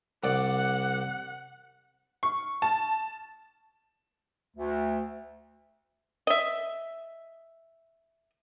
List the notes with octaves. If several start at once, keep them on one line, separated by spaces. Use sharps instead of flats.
C2 D5 F#5
C#6
A5
D2
D#5 E5